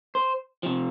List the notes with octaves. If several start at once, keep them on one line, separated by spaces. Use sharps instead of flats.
C5
C3 F3